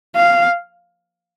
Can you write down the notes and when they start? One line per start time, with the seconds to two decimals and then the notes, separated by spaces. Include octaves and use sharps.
0.16 F5